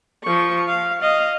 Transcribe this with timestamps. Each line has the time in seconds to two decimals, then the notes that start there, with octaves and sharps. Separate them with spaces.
0.24 F3 C#6
0.68 F5
1.02 D#5 F5